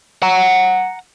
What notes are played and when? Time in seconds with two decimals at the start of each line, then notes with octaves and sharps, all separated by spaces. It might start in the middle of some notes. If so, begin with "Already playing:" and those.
0.23 F#5 A#5